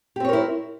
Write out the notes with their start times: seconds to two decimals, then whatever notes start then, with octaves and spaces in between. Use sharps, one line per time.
0.16 G4
0.20 C4
0.25 C#5
0.29 A#4
0.33 E4